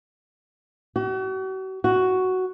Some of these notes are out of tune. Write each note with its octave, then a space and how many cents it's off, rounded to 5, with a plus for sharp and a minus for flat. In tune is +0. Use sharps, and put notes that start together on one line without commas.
F#4 +40
F#4 +5